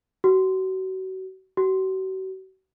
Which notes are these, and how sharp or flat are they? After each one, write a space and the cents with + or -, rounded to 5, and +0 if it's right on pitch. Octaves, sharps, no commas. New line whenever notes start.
F#4 +30
F#4 +40